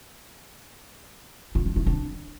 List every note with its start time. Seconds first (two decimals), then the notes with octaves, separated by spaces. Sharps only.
1.55 F4
1.66 D4
1.76 E4
1.86 D4